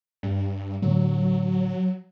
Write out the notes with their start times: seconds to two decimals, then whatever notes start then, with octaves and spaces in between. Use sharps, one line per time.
0.23 G2
0.82 A2 D3 F#3 A3